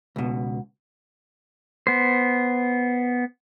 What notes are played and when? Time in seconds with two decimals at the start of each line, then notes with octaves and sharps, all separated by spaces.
0.16 C#2 B2
1.87 B3 C5